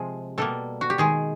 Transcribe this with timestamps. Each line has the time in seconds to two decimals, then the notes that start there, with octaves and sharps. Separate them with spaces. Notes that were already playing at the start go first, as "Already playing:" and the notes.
Already playing: C3 F3 G#3 G#4
0.38 B2 G3 A#3 A4
0.81 F#4
0.90 G4
0.98 D#3 G#3 G#4